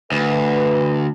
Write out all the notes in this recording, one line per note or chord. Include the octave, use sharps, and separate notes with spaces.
D2 B4